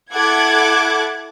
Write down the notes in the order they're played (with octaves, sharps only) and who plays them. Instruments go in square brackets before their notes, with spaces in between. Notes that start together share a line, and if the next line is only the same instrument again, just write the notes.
[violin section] E4 A4 F#5 D6 F#6 G#6